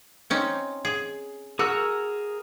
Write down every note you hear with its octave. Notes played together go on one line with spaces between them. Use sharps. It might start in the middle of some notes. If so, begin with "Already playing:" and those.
C4 C#4 D#4
G#4
F#4 G#4 A#4 E6